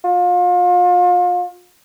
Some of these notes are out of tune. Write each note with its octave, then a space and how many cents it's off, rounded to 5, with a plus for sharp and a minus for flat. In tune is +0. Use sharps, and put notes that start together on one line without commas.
F4 +35